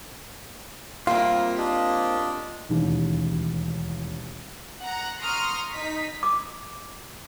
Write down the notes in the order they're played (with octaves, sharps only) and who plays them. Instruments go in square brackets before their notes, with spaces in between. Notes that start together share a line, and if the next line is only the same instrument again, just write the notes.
[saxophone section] G3 A#4 E5 [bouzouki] A#3 C4 [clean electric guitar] F4
[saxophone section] D4 G4 D#5
[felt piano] E1 A1 D#2
[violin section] F#5 A#5
A#5 C6 C#6 D#6 F6
D#4 B6
[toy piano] D6